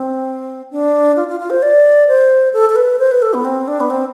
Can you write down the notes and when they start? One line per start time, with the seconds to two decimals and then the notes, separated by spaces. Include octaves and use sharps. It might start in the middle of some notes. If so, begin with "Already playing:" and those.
Already playing: C4
0.71 D4
1.16 F4
1.28 F4
1.40 F4
1.50 C5
1.62 D5
2.08 C5
2.53 A4
2.70 A4
2.76 B4
2.99 C5
3.11 B4
3.22 A4
3.34 B3
3.45 C4
3.68 D4
3.80 B3
3.90 C4